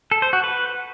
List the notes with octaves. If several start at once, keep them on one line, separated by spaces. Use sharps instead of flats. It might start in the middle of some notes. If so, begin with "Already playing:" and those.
A4
C5
F#4
B4